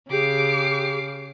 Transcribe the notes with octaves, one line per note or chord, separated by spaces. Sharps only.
C#3 G4 G#4 D6 C7